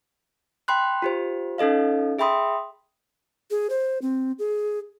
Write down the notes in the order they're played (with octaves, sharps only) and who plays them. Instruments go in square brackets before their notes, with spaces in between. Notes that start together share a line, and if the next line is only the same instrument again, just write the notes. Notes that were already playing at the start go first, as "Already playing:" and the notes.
[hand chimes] G5 B5 C6 F#6
F4 G4 C5
C#4 D#4 A4 D#5 F5
G#4 E5 G5 B5 C6 D#6
[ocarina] G#4
C5
C4
G#4